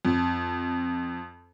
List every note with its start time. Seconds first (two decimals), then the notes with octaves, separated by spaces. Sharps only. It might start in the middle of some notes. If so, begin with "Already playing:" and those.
0.05 F2